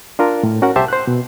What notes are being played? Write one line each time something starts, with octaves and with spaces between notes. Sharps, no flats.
D4 F4 A#4
A2
C#4 F#4 A#4 F#5
C2 G4 C5 E5 A5
C5 F#6
B2